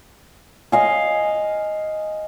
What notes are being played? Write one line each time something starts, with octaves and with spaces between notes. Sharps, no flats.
D#5 F5 G#5